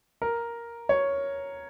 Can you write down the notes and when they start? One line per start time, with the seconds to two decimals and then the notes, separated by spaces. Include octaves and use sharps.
0.22 A#4
0.89 C#5